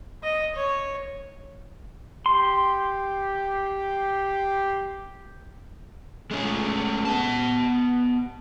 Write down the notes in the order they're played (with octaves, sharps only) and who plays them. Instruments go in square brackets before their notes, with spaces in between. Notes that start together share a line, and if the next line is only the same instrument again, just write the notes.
[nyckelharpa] D#5
C#5
[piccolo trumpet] G4 [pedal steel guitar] C6
[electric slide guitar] G#3 A3 C#4 G#4
B3 A5